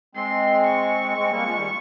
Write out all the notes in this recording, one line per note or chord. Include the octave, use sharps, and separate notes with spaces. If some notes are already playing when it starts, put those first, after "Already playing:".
G#3 C4 C6
C#6
G#3 C4
G3 A#3
F3 G#3
D#3 G3